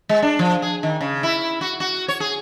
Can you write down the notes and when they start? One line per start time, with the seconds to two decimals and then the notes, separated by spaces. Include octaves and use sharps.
0.09 G#3
0.22 D4
0.39 F3
0.62 G#4
0.83 D#3
1.01 C#3
1.23 E4
1.61 F#4
1.80 F#4
2.08 C#5
2.20 G#4